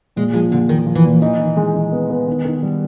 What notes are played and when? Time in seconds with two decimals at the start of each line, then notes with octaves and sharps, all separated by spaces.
0.16 A#2 G#3
0.33 F3 G#3
0.52 A#2 D3
0.69 D#3 A#3
0.86 F3
0.95 E3
1.04 A#2
1.22 E3 D#4
1.40 D#3
1.57 G#3
1.75 D#4
1.92 B3
2.10 B3
2.28 D#3
2.45 D#3
2.63 G3